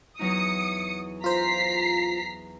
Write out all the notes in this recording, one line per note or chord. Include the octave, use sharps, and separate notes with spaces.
E2 F#3 D#4 D#6 C#7
F4 C5 A#5 B6 C7